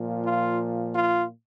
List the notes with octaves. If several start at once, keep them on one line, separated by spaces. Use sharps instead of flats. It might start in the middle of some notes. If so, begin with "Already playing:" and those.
Already playing: A#2 F3
F4
F4